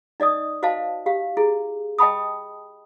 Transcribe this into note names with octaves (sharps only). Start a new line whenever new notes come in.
D#4 D5 D#5 D#6
F#4 C5 D#5 F5 A5
G4 F5
E4 G#4
D#5 G5 A5 B5 D#6